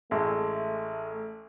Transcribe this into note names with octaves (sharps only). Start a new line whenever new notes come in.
A1 G#3 A3 A4